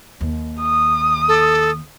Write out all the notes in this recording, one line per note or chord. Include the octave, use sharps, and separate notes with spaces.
D#2
D#6
A4